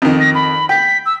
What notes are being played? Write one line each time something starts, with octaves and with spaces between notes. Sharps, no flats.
F2 D#3
A#6
B5
G5 B6
E6